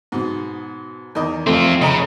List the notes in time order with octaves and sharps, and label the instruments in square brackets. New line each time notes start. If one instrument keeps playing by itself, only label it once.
[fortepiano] G#2 B2
E2 D#3 D#5
[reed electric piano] F2 A3 [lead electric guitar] C4 F4
[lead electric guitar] C#3 [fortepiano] D#5 A#5 B5